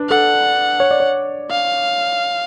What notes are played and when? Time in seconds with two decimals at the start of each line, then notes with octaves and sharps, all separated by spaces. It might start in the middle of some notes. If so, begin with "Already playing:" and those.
Already playing: D4 B4
0.10 A4 F#5
0.80 C#5
0.91 D5
1.00 C#5
1.50 F5